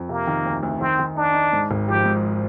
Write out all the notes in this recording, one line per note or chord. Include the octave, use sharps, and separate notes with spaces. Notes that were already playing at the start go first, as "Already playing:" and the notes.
Already playing: F2
C3 A#3
D#3
D2
D2
D#3 C4
D#3
D4 D#4
D#4
G#2
G#1
F3 G4
G#2